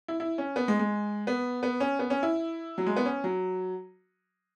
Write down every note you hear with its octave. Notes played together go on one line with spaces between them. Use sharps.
E4
E4
C#4
B3
G#3
G#3
B3
B3
C#4
B3
C#4
E4
F#3
G#3
B3
C#4
F#3